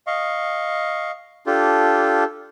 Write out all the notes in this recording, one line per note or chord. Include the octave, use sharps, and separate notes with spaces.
D#5 F5 C#6
D4 F4 G4 A4